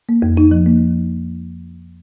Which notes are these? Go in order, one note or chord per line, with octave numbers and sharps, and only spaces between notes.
A#3
F2
D#4
F3
A#3